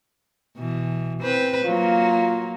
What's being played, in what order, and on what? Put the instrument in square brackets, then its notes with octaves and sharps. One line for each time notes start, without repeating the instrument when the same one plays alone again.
[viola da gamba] B2 E3
C4 B4 C5
[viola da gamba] F#3 A#3 [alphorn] F4